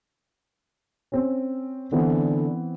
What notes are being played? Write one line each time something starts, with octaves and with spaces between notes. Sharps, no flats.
C4 C#4
D3 E3 B3 C4